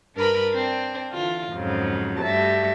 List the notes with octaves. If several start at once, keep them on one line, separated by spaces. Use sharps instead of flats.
G2 D4 A#4 B4 B5
C4 D4
D3 E3 F4
F2 G#2 C#3 F3 F#3
G2 G3 A3 F#4 E5 A5